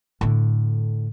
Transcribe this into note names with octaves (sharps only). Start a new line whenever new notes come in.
A2 D3